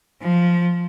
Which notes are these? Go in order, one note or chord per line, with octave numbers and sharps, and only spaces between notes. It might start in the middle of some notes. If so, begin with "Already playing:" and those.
F3